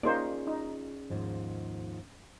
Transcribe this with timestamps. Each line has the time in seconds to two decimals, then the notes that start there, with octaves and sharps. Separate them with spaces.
0.03 A#3 C#4 D#4 F4 G#4 C5 D5
0.47 D#4
1.10 D#2 G#2 F3